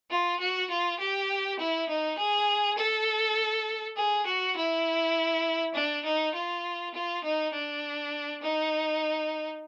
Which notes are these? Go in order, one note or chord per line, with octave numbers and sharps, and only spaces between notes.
F4
F#4
F4
G4
E4
D#4
G#4
A4
G#4
F#4
E4
D4
D#4
F4
F4
D#4
D4
D#4